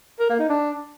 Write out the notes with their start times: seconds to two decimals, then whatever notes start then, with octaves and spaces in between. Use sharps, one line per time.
0.20 A#4
0.29 A#3
0.39 D#4
0.49 D4